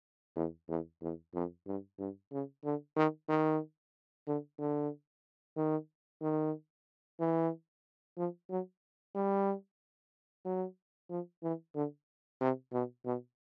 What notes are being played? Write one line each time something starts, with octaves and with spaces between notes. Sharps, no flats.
E2
E2
E2
F2
G2
G2
C#3
D3
D#3
D#3
D3
D3
D#3
D#3
E3
F3
F#3
G3
F#3
F3
E3
D3
C3
B2
B2